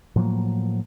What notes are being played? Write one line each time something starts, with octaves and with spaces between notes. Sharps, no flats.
A2 F3 F#3 A#3